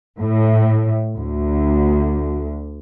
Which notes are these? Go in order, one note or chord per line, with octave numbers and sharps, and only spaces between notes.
A2
D2